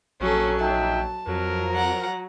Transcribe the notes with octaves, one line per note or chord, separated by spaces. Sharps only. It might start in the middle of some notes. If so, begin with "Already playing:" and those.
A#1 F#3 C#4 A4
D#4 E5 G5 A5
F2 F3 F#3 A#4
F#5 A#5